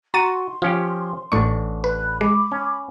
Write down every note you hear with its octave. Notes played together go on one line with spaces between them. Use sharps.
F#4 A#5 C6 A6 D#7
F3 C#4 F4 G4
A1 A2 D4 C#6
B4 B5 F#6
G#3 B5 D6
C#4